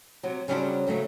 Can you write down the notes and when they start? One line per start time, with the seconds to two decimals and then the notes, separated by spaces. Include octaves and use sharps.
0.23 C3 F#3
0.48 C#3 F#3 G3 C#4 D4 C5
0.87 C#3 F#3 A3